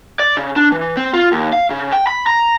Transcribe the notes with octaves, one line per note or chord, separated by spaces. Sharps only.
D5
C#3
D4
E3
C4
F4
D#2
F5
C#3
G5
B5
A#5